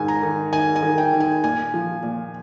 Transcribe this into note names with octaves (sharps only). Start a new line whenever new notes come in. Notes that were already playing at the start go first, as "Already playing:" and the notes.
Already playing: G#2 D#3 G#5
A#5
D#3
D#3 G#5
G#5
D#3
G5
D#3
G#5
A#2 G#5
F3
A#2